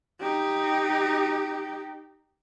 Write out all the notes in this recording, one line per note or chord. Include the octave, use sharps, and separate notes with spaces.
D#4 G4